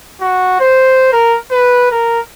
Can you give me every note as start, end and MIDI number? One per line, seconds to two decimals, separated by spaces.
0.21 0.56 66
0.60 1.11 72
1.13 1.37 70
1.51 1.89 71
1.92 2.20 70